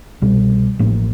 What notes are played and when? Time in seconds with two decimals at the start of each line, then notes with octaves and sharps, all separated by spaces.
0.22 C2 B2 G3
0.79 A1 A2 F3 A#3